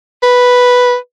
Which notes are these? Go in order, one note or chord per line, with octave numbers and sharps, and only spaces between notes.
B4